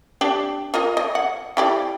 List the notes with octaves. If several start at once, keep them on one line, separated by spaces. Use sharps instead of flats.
D4 G4 D5
F4 A#4 D#5
D#5
F#5
E4 G4 D5